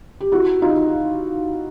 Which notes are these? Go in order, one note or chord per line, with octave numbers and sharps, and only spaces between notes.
G4
E4 F#4
D#4 F4